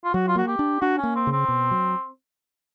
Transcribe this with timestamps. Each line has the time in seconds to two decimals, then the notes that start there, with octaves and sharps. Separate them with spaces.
0.04 F4
0.13 F#3 F#4
0.28 F4
0.36 A#3 F#4
0.47 G4
0.59 D4
0.81 D4 F#4
0.98 C#4
1.03 A#3
1.15 C4
1.27 C#3
1.32 C4
1.48 B2
1.71 F#3